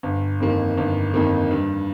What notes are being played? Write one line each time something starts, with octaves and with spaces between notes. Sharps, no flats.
G1
F2 D#3 A#3
G1
F2 D#3 A#3
G2